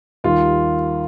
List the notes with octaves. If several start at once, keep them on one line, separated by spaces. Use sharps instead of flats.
D#2 D#3 G3 F4